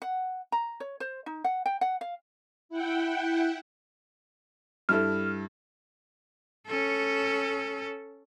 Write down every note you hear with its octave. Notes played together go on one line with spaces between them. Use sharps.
F#5
A#5
C#5
C5
D#4
F#5
G5
F#5
F5
E4 F#5 G5
G2 E4 A4 F6
C#4 A4